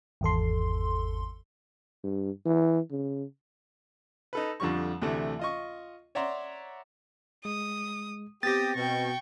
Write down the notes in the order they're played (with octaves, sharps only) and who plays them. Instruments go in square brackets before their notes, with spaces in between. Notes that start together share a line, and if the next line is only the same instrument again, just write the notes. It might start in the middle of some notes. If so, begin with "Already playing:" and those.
[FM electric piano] G#1 E2 A4 C6
[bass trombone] G2
E3
C#3
[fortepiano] D#4 A4 B4
F2 D3 F3 G3 C#6
D2 C3 E3 A3
F4 D#5 C#6
C#5 D5 E5 F#5 A#5 C6
[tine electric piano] G#3 [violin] D#6
[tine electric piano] B3 C4 [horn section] G4 [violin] D#6 [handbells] A6 A#6
[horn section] B2 [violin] G5 C#6